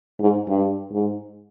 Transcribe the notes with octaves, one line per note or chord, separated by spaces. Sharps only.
G#2
G2
G#2